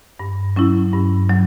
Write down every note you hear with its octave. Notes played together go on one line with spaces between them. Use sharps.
G2
F#3 C#4 E4
G2
F#3